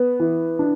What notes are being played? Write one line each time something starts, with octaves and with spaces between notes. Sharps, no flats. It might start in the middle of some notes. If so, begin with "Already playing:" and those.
Already playing: B3
E3
D4